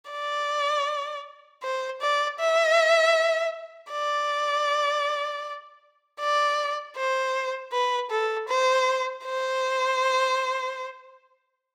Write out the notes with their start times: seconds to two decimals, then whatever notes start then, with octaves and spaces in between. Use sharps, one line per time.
0.11 D5
1.63 C5
2.01 D5
2.39 E5
3.92 D5
6.20 D5
6.97 C5
7.72 B4
8.11 A4
8.49 C5
9.25 C5